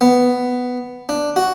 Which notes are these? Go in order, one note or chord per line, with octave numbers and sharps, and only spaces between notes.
B3
D4
F#4